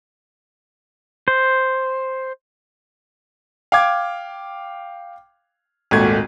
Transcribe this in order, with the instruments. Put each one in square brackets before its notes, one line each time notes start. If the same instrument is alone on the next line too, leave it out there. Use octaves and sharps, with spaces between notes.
[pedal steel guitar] C5
[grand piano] F5 G5 D6 G#6
G#1 D#2 A#2 A3 F#4 G#6